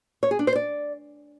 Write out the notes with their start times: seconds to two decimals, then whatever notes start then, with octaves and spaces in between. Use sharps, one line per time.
0.23 C#5
0.31 G#4
0.39 D4
0.47 C5
0.55 D5